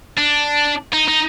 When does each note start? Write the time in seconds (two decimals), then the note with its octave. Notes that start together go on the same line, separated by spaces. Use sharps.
0.18 D4
0.93 D#4
1.08 D#4